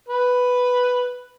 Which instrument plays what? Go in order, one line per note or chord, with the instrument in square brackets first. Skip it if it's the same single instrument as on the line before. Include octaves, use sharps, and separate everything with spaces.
[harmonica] B4